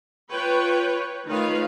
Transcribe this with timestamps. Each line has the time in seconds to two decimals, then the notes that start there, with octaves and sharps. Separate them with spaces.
0.32 F4 B4 C#5 G5
1.28 D#3 A3 F4 B4 C#5 F5